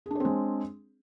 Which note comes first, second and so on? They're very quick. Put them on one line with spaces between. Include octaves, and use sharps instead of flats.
G#4 D4 C#5 C4 G#3